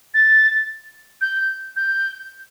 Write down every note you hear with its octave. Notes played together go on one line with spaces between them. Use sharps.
A6
G6
G6